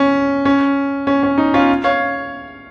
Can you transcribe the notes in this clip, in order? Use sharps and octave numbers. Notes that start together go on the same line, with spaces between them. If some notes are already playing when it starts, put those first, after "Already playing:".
Already playing: C#4
C#4
C#4
C#4
D#4
C#4 F4
C#5 F5